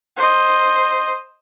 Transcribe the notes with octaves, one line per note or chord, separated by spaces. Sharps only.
C5 D#5